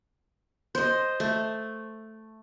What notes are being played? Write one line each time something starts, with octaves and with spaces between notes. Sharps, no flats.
C5 D#5
A3